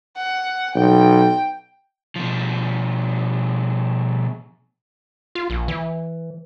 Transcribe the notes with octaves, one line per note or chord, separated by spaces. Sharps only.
F#5
B1 G5
B2 F3
F4
A#1
E3